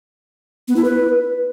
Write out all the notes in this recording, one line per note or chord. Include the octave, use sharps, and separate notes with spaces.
B3
E4
B4